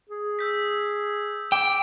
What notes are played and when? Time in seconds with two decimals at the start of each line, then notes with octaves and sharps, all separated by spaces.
0.09 G#4
0.39 E6 G6 B6
1.52 G5 D6